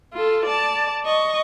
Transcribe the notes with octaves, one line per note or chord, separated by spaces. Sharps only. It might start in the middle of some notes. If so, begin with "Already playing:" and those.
F4 A4
D5 A5
D#5 C#6